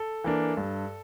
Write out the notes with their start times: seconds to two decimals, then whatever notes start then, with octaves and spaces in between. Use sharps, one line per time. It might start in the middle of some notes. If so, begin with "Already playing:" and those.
Already playing: A4
0.24 E3 A#3 D4
0.57 G2